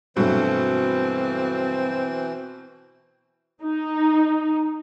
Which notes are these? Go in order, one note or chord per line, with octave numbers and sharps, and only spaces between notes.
G2 B2 E3 F#3 A3 C4
D#4